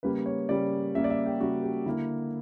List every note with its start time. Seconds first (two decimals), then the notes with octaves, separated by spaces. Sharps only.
0.03 C#3 G3 A#3 B4
0.26 C#5
0.49 C#3 G3 A#3 D5
0.95 C#3 G3 A#3 E5
1.04 D5
1.10 E5
1.26 G4
1.40 C#3 G3 A#3 F#4
1.63 G4
1.86 D3 A#3 E4